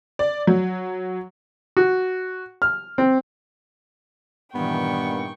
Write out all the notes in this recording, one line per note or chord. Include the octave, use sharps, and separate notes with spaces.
D5
F#3
F#4
F6
C4
G2 A#2 D#3 E3 B3 G5 C#6